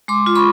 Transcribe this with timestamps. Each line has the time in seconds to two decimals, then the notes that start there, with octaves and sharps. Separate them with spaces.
0.08 G#3 C6 D6
0.26 F4
0.35 B5 C#6